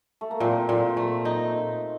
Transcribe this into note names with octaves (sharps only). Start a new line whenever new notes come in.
A3
A#3
A#2 C4
A#2
A3
D#4